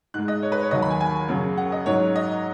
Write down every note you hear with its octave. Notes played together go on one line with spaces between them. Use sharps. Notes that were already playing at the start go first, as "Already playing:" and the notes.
G#2 G#3 F#6
D#5
C#5
B4
C#5
D#2 D#3 F#3 D#5
B5
G#5
G#5
F#2 C#3 F#3
F#5
D#5
G#2 F#3 C#5
D#5